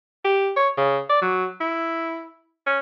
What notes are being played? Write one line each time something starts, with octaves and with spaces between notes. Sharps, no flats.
G4
C#5
C#3
D5
F#3
E4
C#4